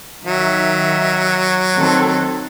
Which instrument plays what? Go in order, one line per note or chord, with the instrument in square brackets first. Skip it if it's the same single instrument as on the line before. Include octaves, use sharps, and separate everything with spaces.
[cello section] D#3 E5 [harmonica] F#3
[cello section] D#3 C4 A4